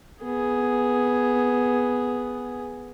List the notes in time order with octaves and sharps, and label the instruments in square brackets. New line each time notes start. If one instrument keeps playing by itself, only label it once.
[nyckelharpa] B3 G#4